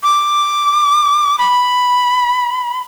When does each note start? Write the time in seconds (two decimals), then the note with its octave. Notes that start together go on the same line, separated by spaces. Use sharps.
0.03 D6
1.39 B5